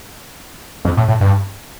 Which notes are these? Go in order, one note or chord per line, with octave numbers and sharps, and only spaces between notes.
F2
A2
A2
G2